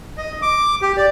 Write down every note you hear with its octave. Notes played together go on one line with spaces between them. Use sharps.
D#5
D6
G4
D5